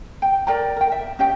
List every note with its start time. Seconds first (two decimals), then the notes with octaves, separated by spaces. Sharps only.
0.22 G5
0.47 A#4 D5 G5 A#5
0.76 A#4 G5
0.92 E5
1.19 C#4 G4 D#5 G5